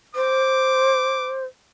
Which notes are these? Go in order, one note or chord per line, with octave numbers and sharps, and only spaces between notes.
C5 D6